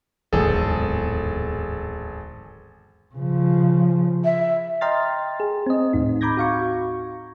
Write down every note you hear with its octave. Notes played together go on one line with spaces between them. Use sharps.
D1 G#1 E2 G#2 G#4 A4
C#3 F3
E5
D#5 G5 A#5 C6 F6 A6
G#4
C4 D#5
D#2 A2 D#4
A#5 B5 D6 G6 G#6 A#6
F#4 F5 C#6